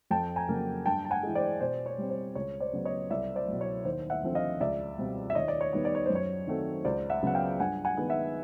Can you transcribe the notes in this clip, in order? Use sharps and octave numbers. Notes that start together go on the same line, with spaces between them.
F2 G5 A5
G#5 A#5
C#3 F#3 A#3
G2 G5 A5
A5
F#5 G#5
E3 G#3
C5 D5
B2 C5 D5
C#5
G3 C4
C5
C#2 C#5
C5 D5
C#3 F#3 B3
C#5 D#5
C2 D5 E5
C5 D5
B2 F#3
C#5
D#2 C5
E5 F#5
D3 F3 A3 C4
D#5 F5
C#2 D5 E5
B2 G3 C4
E5
D#2 C#5 D#5
D5
C#5
D#3 G3 B3
D5
C#5
F#2 C5
C#5
D#3 F#3 A3 C4
C#2 C5 D5
E5 F#5
C#3 F#3 B3 F#5
F5 G5
G2 F#5 G#5
F#5 G#5
D#3 G#3 B3
E5 F#5